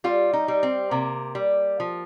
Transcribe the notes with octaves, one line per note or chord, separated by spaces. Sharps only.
G3 F4
D#4
G3
C4
C3 A#3
G3
F3